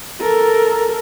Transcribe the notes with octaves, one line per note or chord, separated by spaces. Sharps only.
A4 A#4